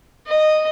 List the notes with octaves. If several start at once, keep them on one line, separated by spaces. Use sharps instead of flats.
D#5